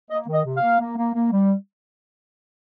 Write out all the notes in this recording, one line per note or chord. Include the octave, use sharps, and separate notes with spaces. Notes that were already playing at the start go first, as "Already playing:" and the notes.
A#3 D#5
D#3
D#5
C3
A#3 F5
A#3
A#3
A#3
G3